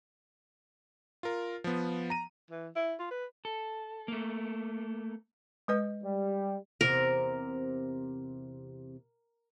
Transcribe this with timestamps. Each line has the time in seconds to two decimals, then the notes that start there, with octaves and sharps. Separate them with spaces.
1.23 F4 A#4
1.64 F3 B3
2.10 A#5 D#7
2.51 E3
2.76 E4
3.00 F4
3.11 B4
3.45 A4
4.08 A3 A#3
5.68 G#3 B4 D#5
6.03 G3
6.81 E2 C3 A#4